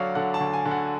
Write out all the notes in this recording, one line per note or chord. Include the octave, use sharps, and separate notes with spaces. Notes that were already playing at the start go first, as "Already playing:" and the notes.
Already playing: D2 D3 F#3 C#5 D5 F5
D3 F#5
A5
D2
G#5
D3
F#5